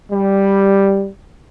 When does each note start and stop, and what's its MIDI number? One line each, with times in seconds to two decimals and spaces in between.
0.11 1.07 55